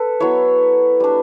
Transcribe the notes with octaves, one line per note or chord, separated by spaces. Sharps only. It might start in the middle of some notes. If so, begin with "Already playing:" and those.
Already playing: A4 B4
F#3 B3 E4 C#5 E5
G3 D4